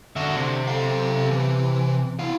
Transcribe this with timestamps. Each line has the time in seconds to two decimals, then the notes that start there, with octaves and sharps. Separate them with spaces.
0.16 D3 F#4 E5
0.36 C3
0.68 A4 F5
1.31 E3
2.19 E4 F5